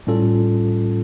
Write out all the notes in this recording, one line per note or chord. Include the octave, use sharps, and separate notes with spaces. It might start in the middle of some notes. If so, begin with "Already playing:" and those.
A2 G3 C#4 F4 A4